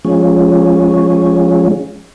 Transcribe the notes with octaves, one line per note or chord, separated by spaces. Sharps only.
F3 G#3 C#4